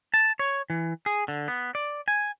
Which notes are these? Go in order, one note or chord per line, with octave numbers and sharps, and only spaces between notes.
A5
C#5
E3
G#4
D3
B3
D5
G#5